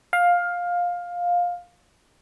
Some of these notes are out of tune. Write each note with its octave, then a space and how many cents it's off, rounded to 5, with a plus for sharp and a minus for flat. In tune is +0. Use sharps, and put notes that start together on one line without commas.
F5 +15